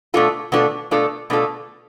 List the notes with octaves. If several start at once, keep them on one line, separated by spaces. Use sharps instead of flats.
B2 A3 D4 F4 A4
B2 A3 D4 F4 A4
B2 A3 D4 F4 A4
B2 A3 D4 F4 A4